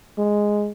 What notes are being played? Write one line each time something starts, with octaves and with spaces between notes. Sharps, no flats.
G#3